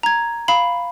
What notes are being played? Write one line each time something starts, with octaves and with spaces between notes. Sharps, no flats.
A#5 G#6
F5 B5